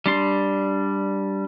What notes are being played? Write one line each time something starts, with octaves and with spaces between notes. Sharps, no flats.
G3 D4 C6